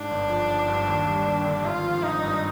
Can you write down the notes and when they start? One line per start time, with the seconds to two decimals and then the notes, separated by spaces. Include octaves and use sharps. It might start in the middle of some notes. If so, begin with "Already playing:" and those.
Already playing: G#2 D4
0.11 G1
0.30 F3
0.50 G1
0.68 G2
0.88 D#2
1.07 G3
1.26 D#2
1.46 D3
1.64 G#1 F4
1.84 F3
2.03 G#1 D#4
2.23 G2